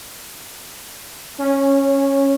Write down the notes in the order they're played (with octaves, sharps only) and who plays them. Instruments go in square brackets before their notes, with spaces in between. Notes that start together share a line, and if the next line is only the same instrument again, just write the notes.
[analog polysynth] C#4